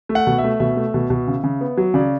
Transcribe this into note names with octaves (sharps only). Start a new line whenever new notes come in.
A3
F#5
B2
E5
A3
B2 E5
A3
B2
B2
C#3
C#3
B3
F#3
C#3 D5